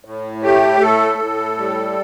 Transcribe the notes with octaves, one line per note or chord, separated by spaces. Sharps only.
A2
A3 G4
A2 A4
A2
G3